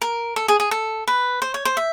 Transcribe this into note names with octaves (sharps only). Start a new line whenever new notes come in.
A#4
A4
G#4
G#4
A4
B4
C5
C#5
C5
E5